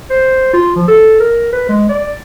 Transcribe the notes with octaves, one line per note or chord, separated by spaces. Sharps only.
C5
F4
F3
A4
A#4
B4
G#3
D5